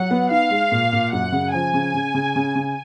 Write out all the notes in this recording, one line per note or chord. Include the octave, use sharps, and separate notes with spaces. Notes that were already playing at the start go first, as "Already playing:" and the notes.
Already playing: F#3 F#5
B3
D#4 F5
G#3
A#2
A#2
F#2 F#5
C#3
F3 G#5
C#3
C#3
C#3
C#3
C#3